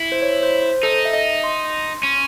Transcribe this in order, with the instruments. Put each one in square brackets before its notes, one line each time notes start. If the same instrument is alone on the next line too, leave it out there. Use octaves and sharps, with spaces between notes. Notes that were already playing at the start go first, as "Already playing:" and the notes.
Already playing: [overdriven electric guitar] E4
[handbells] C5
C#5
C5
C5
[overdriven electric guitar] D#4 [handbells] A4
[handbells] E5
D#5
C6
[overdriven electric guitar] C#4